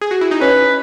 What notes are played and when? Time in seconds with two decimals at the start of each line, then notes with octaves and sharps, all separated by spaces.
0.01 G#4
0.11 F#4
0.21 E4
0.31 D#4
0.41 C#4 B4